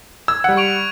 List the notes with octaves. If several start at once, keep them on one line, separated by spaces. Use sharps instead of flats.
E6 G#6
G3 F#5
C#6 D7 F7